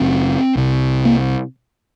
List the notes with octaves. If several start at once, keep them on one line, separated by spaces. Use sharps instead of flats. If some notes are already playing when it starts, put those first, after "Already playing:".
Already playing: F#1 F#2 C#3 C4
C2 C3
A#3